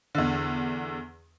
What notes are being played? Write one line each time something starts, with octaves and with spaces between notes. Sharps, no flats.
E2 D3